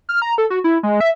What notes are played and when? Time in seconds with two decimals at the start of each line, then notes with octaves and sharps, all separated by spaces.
0.09 F6
0.22 A#5
0.38 A4
0.50 F#4
0.64 E4
0.83 G#3
1.01 E5